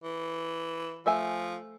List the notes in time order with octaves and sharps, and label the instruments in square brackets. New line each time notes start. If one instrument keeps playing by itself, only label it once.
[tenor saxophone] E3
[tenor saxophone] F3 [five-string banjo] A3 E5 G#5